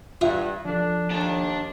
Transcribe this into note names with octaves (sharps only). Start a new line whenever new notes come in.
G2 F4 E5 F#5
F3 D4 A4
D#2 D4 A5